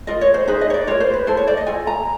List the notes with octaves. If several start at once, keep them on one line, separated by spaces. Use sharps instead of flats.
F4 A#4 D#5
C#5
C5
D#4 G#4 B4 C5
D#5
C#5
D5
F4 A#4 C#5
C5
B4
E4 A4 C5
C#5
D5
D#5
F4 A4 G#5
A#5